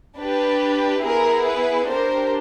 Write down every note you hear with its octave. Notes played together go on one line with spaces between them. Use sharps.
D4 G4 B4
B3 E4 G#4 A#4
B4
D4 G4 A#4 C5